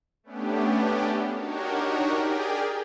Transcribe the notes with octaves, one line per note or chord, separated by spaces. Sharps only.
A3 B3 C#4 D4 G4
D4 D#4 F#4 G4 A#4 C#5
G4 G#4 A#4 D5 G5 G#5